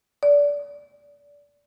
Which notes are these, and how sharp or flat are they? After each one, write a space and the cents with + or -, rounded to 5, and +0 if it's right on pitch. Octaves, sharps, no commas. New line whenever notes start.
D5 -25